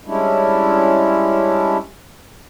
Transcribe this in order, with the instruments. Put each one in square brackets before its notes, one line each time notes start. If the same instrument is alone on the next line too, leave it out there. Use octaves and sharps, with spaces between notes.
[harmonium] G3 G#3 C#4 D4 E4